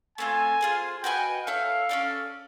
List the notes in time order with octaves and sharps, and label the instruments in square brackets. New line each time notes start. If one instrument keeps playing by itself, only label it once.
[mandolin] A3 C4 F4 [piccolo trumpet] G#5
[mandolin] F4 G#4 C5
[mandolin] F#4 B4 D#5 G#5 [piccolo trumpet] G5
[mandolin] E4 A4 C#5 [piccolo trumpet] F5
[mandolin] C#4 F4 A4 D5